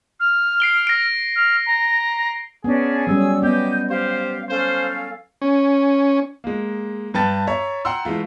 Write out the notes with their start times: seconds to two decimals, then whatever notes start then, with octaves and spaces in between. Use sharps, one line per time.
0.20 F6
0.60 C7 D7 G7
0.87 A#6 D7
1.36 F6
1.66 A#5
2.64 B3 C#4 D4 G#4
3.07 F#3 G3 C#4 E6
3.43 B3 G4 D#5 G6
3.90 G4 C5 F5
4.49 C#4 A4 C5 F5
5.42 C#4
6.44 G#3 A#3
7.14 G2 B4 G5 A5 A6
7.47 C#5 E5 A#5
7.85 F#5 G5 A#5 C6 E6
8.05 E3 G#3 A3 F4